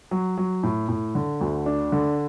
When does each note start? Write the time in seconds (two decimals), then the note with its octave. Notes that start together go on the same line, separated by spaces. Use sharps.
0.11 F#3
0.37 F#3
0.63 A2
0.89 A2
1.15 D3
1.41 D2
1.66 D4
1.92 D3